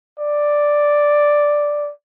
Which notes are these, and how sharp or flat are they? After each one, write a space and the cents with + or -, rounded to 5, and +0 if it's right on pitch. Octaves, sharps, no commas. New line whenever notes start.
D5 +0